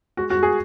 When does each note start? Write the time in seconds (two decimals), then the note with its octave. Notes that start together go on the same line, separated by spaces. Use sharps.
0.17 G#3 F#4
0.30 F#4
0.36 G#3
0.43 G#4